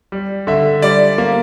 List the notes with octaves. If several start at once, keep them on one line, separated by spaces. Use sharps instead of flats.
G3
D3 E5
G3 D5
A#3